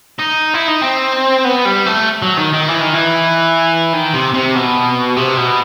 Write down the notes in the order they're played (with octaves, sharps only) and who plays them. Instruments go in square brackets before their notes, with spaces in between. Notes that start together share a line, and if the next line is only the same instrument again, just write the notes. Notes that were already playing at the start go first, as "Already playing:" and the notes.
[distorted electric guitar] D#4
E4
D#4
C4
B3
G3
A3
F#3
D#3
D#3
E3
D#3
E3
D#3
C3
C3
B2
C3
B2